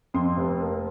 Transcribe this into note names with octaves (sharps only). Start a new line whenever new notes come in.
F2 C6
F1
A#3